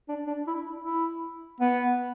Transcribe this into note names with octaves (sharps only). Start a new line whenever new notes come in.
D4
D4
E4
E4
B3